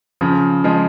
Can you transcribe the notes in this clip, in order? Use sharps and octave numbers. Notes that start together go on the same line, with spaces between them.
C#3 F3
F3 G#3